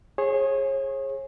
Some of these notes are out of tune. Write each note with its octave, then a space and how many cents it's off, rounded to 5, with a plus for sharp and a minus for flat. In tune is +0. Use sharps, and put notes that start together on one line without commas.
G#4 +0 C#5 -35